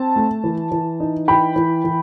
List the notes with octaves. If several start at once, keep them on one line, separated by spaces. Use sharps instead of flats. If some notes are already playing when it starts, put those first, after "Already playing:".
Already playing: C4 A5
A3
E3
E3
D#4
E3 G5 B5
E3
E3